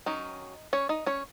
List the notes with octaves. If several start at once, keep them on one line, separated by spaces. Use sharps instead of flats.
D#3 F#3 C#4 D#4
C#4 C#5
D#4 D#5
C#4 C#5